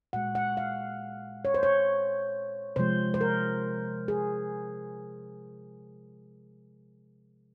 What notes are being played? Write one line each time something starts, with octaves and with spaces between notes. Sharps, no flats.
A#2 G#3 F#5
F#5
F5
C#5
C5
C#5
C3 F3 G#3 C5
C5
A#4
G#4